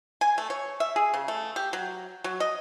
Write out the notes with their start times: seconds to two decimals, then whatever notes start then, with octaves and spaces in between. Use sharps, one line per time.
0.21 G#5
0.38 A3
0.50 C#5
0.80 E5
0.96 G#4
1.14 C#3
1.28 A3
1.56 G4
1.73 F#3
2.24 F#3
2.40 D#5